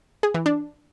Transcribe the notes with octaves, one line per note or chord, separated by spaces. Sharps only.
G#4
E3
D4